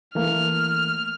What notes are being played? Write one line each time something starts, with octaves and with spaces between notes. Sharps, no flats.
E3 A3 A#3 F6